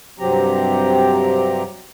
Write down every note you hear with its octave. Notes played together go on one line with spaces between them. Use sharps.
G2 C3 F#3 C4 G4 A#5